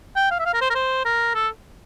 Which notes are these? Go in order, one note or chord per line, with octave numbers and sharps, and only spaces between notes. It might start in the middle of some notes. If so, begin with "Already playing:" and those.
G5
F5
E5
F5
A#4
C5
A#4
C5
A#4
A4